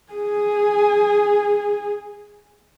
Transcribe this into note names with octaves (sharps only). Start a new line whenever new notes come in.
G#4 G#5